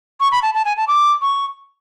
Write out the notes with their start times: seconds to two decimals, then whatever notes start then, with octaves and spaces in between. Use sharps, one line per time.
0.20 C#6
0.32 B5
0.43 A5
0.54 A5
0.65 G#5
0.77 A5
0.88 D6
1.22 C#6